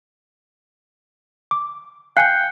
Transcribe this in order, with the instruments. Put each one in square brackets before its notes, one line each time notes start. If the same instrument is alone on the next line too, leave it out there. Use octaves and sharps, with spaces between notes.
[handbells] D6
[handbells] F5 G#5 G6 [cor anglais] G5 [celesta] F#6 C7 C#7